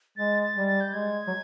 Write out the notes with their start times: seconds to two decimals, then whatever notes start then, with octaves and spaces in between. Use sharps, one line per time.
0.17 G#3 A6
0.43 A6
0.55 G3
0.68 A6
0.81 G6
0.93 G#3 G#6
1.27 F#3